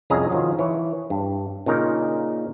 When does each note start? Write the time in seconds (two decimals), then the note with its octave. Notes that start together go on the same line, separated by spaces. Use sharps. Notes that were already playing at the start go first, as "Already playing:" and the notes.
0.10 C2 F2 C#4 G#4 D#5 A#5
0.30 D#3 F3 F#3
0.59 E3 C#5
1.10 G2
1.66 A#2 C#3 D#4 A#4